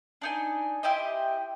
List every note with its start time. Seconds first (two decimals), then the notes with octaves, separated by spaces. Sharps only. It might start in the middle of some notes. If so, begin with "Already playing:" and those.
0.22 D4 D#4 G#5
0.83 E4 G4 C5 D#5